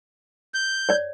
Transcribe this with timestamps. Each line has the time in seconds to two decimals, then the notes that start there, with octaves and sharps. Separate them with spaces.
0.54 G6
0.89 C#5 D5